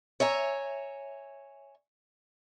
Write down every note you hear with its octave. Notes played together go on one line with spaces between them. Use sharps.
C#5 E5 G#5 A#5